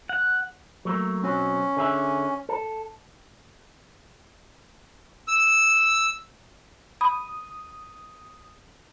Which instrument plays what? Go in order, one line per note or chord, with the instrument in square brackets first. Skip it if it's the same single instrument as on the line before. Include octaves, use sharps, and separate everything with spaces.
[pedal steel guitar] F#5
[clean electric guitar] F#3 A3 A#3
[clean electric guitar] B1 C4 F#4 [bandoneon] C#4
[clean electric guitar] D3 G#4 E5
A4
[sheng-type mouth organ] E6
[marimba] B5 [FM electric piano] D#6